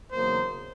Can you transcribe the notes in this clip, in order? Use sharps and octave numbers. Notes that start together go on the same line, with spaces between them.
E2 C#3 F#3 A#3 D#4 C5